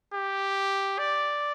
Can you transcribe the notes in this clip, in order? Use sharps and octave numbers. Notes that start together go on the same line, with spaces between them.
G4
D5